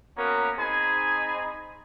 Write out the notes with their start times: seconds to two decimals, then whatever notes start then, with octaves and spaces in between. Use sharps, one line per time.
0.17 A#3 B3 C#4 F#4 A#4
0.58 C4 D#4 G#4 G#5 B5